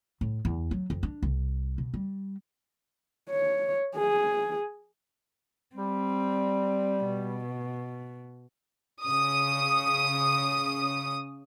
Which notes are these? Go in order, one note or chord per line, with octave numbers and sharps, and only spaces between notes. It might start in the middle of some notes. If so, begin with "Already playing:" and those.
A2
E2
F#3
F2
D4
C2
B2
G3
C#5
G#4
G3 C4
B2
C#3 D#6